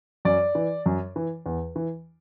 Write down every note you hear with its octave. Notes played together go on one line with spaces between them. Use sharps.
F#2 D5
E3
F#2
E3
E2
E3